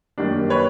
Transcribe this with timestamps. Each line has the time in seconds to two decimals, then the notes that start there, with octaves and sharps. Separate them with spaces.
0.18 F#2 D#3 G3 A#3 D4
0.50 B4 C#5